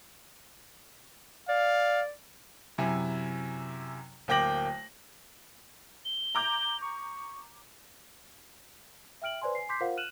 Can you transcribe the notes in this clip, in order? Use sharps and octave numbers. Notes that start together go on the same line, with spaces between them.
D5 F5
F#2 C3 E4 G#5
D1 A#3 G5 D6 A#6 F#7
G7
A#5 D6 G6
C#6
E5 G5 F6 D7 F#7
B4 C5 D5 G#5 C6
G#5 C7
C6 D6 G6 B6 C7
F4 A#4 C5 F5 F#5
F6 F#6 D#7 E7 F#7